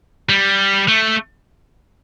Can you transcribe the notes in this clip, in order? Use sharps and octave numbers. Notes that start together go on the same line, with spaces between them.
G3
A3